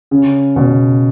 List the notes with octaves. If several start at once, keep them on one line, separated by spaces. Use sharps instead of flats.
C#3
B2